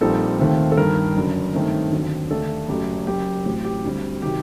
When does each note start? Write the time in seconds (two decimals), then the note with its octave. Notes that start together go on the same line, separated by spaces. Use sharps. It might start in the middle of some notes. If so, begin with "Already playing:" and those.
0.01 A#1 A#2 G3 C4 D#4 A4
0.39 D#2 D#3 A3 C4
0.72 A4
0.77 G1 G2 D#3 A#4
1.16 F#1 F#2 D3
1.54 G2 D#3 A3 C4 D#4
1.92 D#2 D3 F#3 C4
2.30 D#2 D3 A3 D4 A4
2.68 F#1 F#2 F#3 A3 G4
3.07 F#1 F#2 F#3 G4
3.45 A1 A2 F#3 C4 G4
3.64 G4
3.84 D2 D3 G3 C4
4.22 C3 D#3 F#3 G4